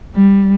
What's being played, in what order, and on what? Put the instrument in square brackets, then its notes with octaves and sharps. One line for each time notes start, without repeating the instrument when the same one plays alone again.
[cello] G3